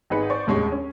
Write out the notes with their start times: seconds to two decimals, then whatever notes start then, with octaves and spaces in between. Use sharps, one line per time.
0.10 G#1 D#4 G#4 B4 C#7
0.30 C5 D5 C#6
0.47 F1 D#2 A2 G#3 C#4 C#6
0.72 C#4